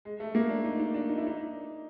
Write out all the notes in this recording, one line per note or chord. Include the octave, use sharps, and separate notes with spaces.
G#3
A3
A#3
D4
D#4
D#4
D4
D#4
E4
D#4